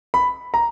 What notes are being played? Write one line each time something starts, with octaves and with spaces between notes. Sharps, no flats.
B5
A#5